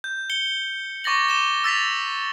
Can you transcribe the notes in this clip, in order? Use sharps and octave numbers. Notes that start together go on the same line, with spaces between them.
G6
C#7 G7
C#6 D6 A6 A#6 F#7
D6 E7 G7
E6 A6 B6 F7